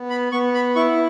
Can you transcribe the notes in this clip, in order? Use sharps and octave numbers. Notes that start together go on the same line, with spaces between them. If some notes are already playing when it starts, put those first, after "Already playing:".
Already playing: B3
B5
B3 C#6
B5
E4 C#6